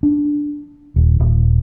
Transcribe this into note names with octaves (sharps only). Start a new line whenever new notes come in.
D4
D#1
D#1